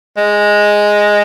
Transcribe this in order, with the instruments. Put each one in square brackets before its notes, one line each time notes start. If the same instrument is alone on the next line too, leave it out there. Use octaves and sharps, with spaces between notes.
[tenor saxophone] G#3